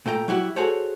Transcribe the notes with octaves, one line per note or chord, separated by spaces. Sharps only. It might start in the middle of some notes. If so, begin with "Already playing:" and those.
A#2 A3 G5 A#5
F#3 E4 F#4 G4
F#4 G#4 A4 C5 C#5